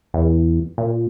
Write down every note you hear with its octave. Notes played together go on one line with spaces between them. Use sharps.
E2
A#2